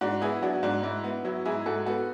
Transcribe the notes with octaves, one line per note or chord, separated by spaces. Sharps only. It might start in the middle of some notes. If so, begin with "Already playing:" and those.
G#2 D4 F#4
B3 E4 G#4
F#3 D4 F#4
G#2 D4 F#4
G#2 E4
B3
F#3 E4
G#2 E4 G#4
G#2 F#4 A4
B3 F#4 A4